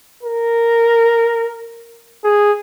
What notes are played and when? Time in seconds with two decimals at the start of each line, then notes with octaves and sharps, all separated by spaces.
0.23 A#4
2.24 G#4